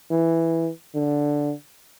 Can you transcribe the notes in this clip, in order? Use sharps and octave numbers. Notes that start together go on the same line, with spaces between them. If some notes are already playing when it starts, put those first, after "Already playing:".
E3
D3